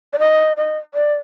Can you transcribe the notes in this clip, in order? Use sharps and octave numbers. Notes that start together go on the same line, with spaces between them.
D5
D#5
D#5
D5